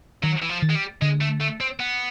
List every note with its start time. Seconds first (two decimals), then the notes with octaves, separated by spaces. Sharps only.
0.23 D#3 F#3
0.42 E3
0.49 F3
0.62 D#3
0.70 G#3
0.75 G3
1.02 D3 G#3
1.21 A3
1.41 A3
1.61 C4
1.80 B3